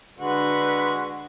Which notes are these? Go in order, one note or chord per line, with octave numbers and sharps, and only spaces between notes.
D3 G#3 F#4 B4